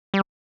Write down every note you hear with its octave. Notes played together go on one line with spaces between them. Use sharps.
G3